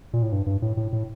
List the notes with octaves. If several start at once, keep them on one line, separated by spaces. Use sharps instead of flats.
A#2
A2
G2
G2
A2
A2
A2